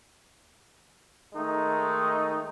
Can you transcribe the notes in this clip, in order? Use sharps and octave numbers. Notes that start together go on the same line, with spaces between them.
D#3 G#3 A3 D#4